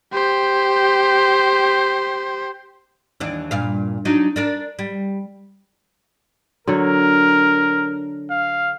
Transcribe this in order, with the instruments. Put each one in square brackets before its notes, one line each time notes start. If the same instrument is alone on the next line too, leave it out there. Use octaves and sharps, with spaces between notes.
[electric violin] G4 C5
[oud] D#2 E3 D4
G2 A#2 F5
F#3 D4 D#4
D4 A#4 D5
G3
[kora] D3 F#3 C#5 [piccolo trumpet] A#4
[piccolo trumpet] F5